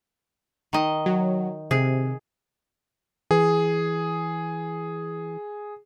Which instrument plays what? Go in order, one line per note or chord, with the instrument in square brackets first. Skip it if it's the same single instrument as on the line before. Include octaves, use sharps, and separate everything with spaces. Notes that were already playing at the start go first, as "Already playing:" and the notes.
[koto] D#3 D#5
[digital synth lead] F#3
[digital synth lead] C3 [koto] G#4
[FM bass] E3 [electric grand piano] G#4